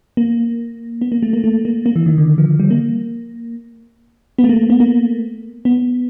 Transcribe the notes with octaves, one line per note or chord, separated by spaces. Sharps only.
A#3
B3
A#3
A3
A#3
A3
A#3
A#3
E3
D#3
D3
F3
G3
A#3
B3
A3
A#3
B3
A#3
B3